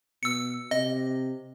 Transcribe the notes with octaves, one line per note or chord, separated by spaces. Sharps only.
B2 E6 C#7
C3 D#5